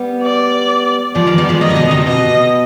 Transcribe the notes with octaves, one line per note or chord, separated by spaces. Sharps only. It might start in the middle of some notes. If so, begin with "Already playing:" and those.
Already playing: G3 B3
D5
F3 G#3 D5
D#3 G3
G3 B3
F3 G#3
D#3 G3 D#5
C3
B2 D3
C3
B2 D#5